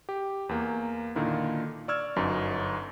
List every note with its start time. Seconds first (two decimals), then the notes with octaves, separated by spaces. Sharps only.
0.09 G4
0.49 E2 A#3
1.15 A#2 D3 D#3 A#3 E4
1.88 D5 C#6 E6 F6 G#6
2.16 G1 F#2 D#4